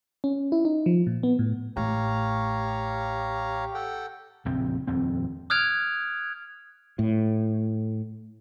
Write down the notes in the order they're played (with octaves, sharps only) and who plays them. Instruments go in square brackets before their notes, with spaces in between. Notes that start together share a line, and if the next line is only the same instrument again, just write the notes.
[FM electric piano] C#4
E4
D#4
F3
A#2
B3
A2
[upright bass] A1 A3 [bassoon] G4 [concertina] C#5 F5 A#5
[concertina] A4 F#5 G5
[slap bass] A#1 F2 C#3 C4
D#1 F2 C4
[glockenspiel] D#6 F6 F#6 G#6 D7 F7
[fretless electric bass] A2